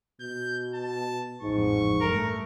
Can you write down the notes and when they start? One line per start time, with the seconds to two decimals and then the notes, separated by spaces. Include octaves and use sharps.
0.21 B2 G6
0.74 A5
1.41 A1 F2 G#2 C#6
2.01 G2 A3 A#4